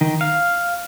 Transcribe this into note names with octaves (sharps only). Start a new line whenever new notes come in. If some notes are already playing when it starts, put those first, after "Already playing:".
D#3
F5